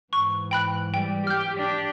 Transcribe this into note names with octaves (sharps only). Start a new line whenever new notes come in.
G#2 E3 C#6
G5 B5 F#6
G3 G5
G4 F6 G6
D4 G4